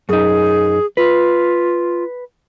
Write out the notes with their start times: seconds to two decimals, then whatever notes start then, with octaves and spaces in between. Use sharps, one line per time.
0.09 F#2 D#4 G#4
0.97 F4 B4